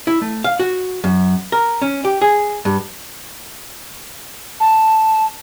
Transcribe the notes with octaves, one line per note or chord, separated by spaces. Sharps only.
E4
A3
F5
F#4
F#2
A#4
C#4
G4
G#4
G2
A5